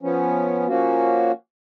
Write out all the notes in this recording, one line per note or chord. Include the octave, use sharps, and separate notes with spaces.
F3 B3 C#4
F3 A#3 C#4 F#4